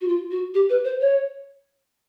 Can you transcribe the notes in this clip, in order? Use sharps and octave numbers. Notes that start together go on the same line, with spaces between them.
F#4
F4
F#4
G4
B4
C5
C#5